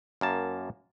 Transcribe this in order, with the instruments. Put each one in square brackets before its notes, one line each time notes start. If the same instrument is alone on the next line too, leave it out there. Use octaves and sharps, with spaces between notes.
[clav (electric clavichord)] F#2 A#3 A5